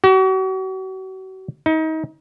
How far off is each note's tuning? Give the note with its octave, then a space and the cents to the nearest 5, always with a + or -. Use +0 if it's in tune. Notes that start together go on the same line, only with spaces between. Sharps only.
F#4 +40
D#4 +30